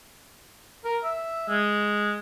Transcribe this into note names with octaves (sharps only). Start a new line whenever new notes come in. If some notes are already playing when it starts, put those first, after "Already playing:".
A#4
E5
G#3